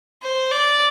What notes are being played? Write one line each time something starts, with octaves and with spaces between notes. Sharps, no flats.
C5
D5